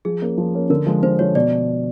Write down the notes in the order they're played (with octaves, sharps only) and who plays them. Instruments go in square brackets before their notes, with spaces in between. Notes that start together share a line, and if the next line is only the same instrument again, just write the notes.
[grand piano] F3 [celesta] G#4
[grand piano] A#3 C#4
F3
A#3 C#4
[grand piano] D3 [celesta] A#4
[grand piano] F3 G#3
[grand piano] D3 [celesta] C5
[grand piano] F3 G#3 [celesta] C#5
[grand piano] B2 [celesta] D5